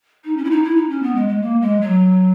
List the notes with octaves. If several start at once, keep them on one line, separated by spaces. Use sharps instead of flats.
D#4
C#4
E4
D#4
E4
D#4
C#4
B3
G#3
G#3
A#3
G#3
F#3